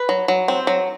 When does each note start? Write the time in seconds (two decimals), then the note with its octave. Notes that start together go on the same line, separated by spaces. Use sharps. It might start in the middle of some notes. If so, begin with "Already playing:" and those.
Already playing: B4
0.09 F#3
0.28 F#3
0.48 C4
0.67 F#3